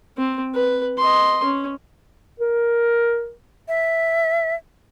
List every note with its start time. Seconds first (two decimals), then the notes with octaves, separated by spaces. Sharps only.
0.17 C4
0.55 B4
0.98 D#5 C6
1.44 C#4
2.40 A#4
3.68 E5